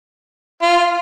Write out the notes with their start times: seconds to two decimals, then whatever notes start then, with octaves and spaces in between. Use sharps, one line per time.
0.62 F4